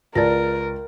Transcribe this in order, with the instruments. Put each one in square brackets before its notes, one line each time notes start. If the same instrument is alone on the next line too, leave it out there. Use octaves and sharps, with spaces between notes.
[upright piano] C#2 A6 [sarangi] A#4 [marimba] D5 A5 A#6